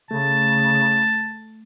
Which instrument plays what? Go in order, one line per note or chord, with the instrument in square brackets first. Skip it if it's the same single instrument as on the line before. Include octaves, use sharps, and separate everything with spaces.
[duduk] C#3 [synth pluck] A3 [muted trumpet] A5